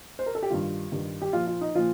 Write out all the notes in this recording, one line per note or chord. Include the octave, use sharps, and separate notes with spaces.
C5
A#4
A4
G4
G2 D#3 G3 F4
G2 D#3 G3
G4
A#2 F3 F4
F4
D#4
A#2 F3 F4